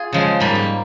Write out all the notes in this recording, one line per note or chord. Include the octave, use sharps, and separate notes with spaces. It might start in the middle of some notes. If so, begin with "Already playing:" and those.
Already playing: F4 G#4
C#3 F3 G#3
G#2 G3 A#3 G4
G4